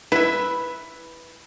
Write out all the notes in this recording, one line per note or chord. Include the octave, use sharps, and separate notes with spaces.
E4 B4 E5